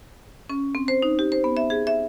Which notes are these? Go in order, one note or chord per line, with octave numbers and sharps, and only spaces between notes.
C#4
C4
C5
D#4
G4
C5
B3
E5
G#4
E5